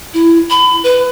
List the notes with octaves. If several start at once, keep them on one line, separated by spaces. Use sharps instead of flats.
E4
B5
B4